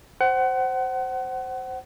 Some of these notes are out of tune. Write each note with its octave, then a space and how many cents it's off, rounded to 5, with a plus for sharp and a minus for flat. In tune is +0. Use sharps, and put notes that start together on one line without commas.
C5 +0 F#5 +30